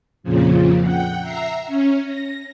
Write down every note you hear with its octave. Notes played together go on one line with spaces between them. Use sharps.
F2 A#2 C#3 F3
F#5 G5
E5 A#5 C7
C#4
A#6